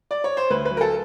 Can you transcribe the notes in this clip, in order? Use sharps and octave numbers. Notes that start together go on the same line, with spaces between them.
D5
C#5
C5
D2 B4
B4
F#3
A#4
A4